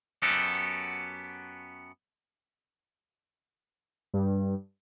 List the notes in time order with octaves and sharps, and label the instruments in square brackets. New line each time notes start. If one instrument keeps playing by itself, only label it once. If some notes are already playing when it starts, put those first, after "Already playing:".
[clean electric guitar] F#2 B3 F#4 G4 A4
[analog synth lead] G2